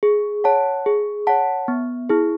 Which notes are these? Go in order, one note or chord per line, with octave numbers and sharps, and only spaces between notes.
G#4
C#5 F#5 A5
G#4
C#5 F#5 A5
B3
E4 G#4